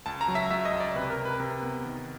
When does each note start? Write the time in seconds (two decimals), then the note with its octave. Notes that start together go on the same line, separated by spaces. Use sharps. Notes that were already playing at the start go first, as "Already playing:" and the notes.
0.06 C#2 A5
0.21 A#5
0.28 F#3
0.35 E5
0.51 C#2 E5
0.65 D#5
0.73 C#2
0.80 D5
0.96 C3 B4
1.10 A#4
1.17 C3
1.25 B4
1.40 C3 A#4
1.63 B3
1.85 D#3